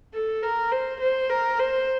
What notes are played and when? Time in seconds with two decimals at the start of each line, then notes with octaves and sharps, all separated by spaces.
0.14 A4
0.43 A#4
0.71 C5
1.01 C5
1.29 A#4
1.59 C5